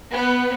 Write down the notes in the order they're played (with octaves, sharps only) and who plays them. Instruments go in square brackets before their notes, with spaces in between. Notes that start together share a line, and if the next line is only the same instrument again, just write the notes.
[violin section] B3